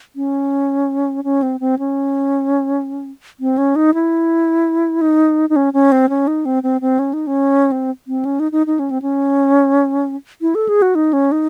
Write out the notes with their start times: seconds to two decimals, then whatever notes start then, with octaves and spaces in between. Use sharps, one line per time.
0.16 C#4
1.24 C#4
1.42 C4
1.60 C4
1.79 C#4
3.40 C4
3.58 C#4
3.76 D#4
3.94 E4
5.01 D#4
5.50 D#4
5.56 C#4
5.73 C#4
5.92 C4
6.09 C#4
6.27 D#4
6.45 C4
6.63 C4
6.81 C4
6.99 C#4
7.13 D#4
7.27 C#4
7.72 C4
8.07 C4
8.25 C#4
8.40 D#4
8.52 D#4
8.67 D#4
8.79 C#4
8.91 C4
9.02 C#4
10.41 E4
10.55 A4
10.69 G#4
10.82 F#4
10.95 D#4
11.13 C#4
11.32 D#4